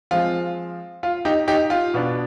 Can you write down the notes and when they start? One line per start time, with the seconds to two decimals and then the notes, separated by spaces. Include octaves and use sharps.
0.11 F3 G#3 C4 F4
1.03 F4
1.25 D#4 G4
1.48 D#4 G4
1.70 F4
1.94 B2 B3 D4